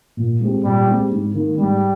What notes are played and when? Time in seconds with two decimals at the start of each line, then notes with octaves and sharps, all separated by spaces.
0.17 A#2
0.40 G#3 C4 G4
0.64 A#2 G3
0.88 G#3 C4 G4
1.11 G#2
1.33 D#3 A#3
1.57 G#2 G3